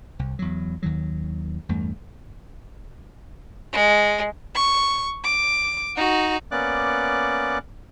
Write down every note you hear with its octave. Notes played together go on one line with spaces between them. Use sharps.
C2
E2 F#3
D#2 D#3 F#3
E2 G2 A3
G#3
C#6
D6
D#4 F#4
A#3 B3 C#4 D5 D6 F#6